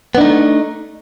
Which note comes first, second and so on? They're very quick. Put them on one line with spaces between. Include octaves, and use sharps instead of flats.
B3 D4 D#4 A3